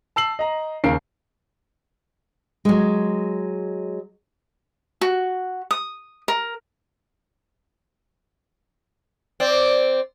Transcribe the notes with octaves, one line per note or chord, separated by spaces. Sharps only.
A5 E6 C7 F#7
D#5 A#5
D#2 C#3 A#4 C7 D7
F#3 G#3
F#4
D#6
A#4
C4 D5